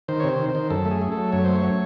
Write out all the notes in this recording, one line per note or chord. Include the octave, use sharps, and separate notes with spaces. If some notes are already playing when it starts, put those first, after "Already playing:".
D#3 C5
C#5
C3
C5
D#3
C5
D#3
F#2 A4
A3
G#4
A3
A4
F#3
F#2 C#5
A3 C5
C#5
F#3